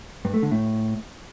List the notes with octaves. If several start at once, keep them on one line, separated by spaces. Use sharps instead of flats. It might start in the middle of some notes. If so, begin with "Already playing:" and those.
G2
A3
D3
A2